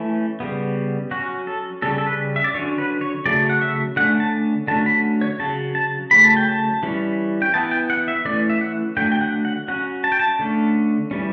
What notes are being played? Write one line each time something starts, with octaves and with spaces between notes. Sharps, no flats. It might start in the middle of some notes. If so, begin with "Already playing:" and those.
Already playing: E3 A3 C#4
C#3 G3 B3
F#3 C#4 F#4
A4
C#3 G3 C#4 A4
A4
B4
E5
D5
D3 F#3 C#4 C#5
B4
C#5
C#3 F#3 A3 D5
F#5
E5
D3 A3 C#4 F#5
A5
D3 F#3 A3 C#4 A5
B5
C#5
C#3 F#3 C#4 A5
A5
C#3 F#3 A3 C#4 B5
A5
G5
A5
E3 G3 C#4
G5
E3 B3 A5
G5
F#5
E5
E3 A3 C#4 D5
E5
F#5
D3 F#3 A3 G5
G5
F#5
F#5
F#3 C#4 F#5
A5
G5
A5
D3 A3 C#4
E3 G3 C#4